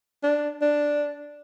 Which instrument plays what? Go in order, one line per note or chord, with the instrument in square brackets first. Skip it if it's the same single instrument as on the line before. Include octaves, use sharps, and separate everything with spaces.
[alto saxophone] D4
D4